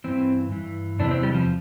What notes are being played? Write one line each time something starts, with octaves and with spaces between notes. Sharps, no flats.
G2 E3 C4
G2 E3
E2 C3 E3 D4
C4
G3
F3